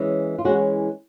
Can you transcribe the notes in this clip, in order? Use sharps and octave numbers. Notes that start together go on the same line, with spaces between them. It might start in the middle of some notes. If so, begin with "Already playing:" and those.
Already playing: E3 G#3 C#4
F4
E3 G#3 C#4 F#4